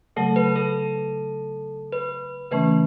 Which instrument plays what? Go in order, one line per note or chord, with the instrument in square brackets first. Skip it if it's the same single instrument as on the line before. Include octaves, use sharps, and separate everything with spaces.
[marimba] C#3 F#3 A3 [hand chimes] A4
[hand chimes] B4
A4
B4
[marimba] C#3 E3 A3 C#4 [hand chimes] B4